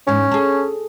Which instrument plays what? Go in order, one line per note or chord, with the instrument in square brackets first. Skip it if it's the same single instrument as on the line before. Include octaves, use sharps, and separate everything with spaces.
[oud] E2 G#2 [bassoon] C#4
[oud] G#4 A4